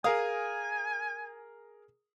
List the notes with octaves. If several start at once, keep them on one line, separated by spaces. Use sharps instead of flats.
G#4 A#4 F5 G#5 D#6